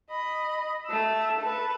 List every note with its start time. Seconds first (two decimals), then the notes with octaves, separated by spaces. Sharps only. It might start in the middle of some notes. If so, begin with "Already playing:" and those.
0.10 D#5 B5
0.87 A3 E6
1.40 A4 B4